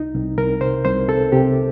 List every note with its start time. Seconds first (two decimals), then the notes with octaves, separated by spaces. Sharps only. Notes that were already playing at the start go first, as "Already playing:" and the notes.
Already playing: C2 D#4
0.14 C2
0.37 C2 A#4
0.61 C3 C5
0.85 C2 C5
1.08 C3 A4
1.32 C3 G4